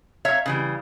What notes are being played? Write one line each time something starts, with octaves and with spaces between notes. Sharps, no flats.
C#5 E5 F5 A#5
C#3 E3 G3